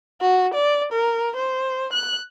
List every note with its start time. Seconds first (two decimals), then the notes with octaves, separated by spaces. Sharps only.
0.21 F#4
0.54 D5
0.92 A#4
1.36 C5
1.93 F#6